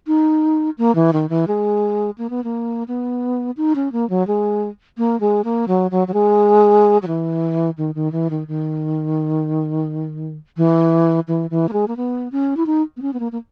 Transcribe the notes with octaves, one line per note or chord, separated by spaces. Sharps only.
D#4
A#3
E3
D#3
E3
G#3
A#3
B3
A#3
B3
D#4
C#4
A#3
F#3
G#3
A#3
G#3
A#3
F#3
F#3
F#3
G#3
F#3
E3
D#3
D#3
E3
D#3
D#3
E3
E3
E3
A#3
G#3
A#3
B3
C#4
E4
D#4
B3
C#4
B3
A#3
A#3